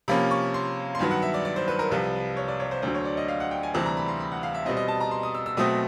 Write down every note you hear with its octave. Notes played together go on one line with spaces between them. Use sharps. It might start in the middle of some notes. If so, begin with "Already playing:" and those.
C3 F3 A#3 C#4 B5
C#6
C6
C6
G2 D#3 F#3 B3 B5
F#5
E5
D5
D5
C5
B4
A#4
C2 C3 F3 B4
C#5
D5
C#5
C5
D2 D3 F#3 C5
C#5
D5
D#5
F5
F#5
G5
G#5
D2 C3 E3 G3 C4 A5
A#5
B5
C6
B5
F#5
F5
E5
B2 G3 C4 D#5
D#5
A5
A#5
C6
D#6
E6
E6
B2 F#3 A3 C4 D#6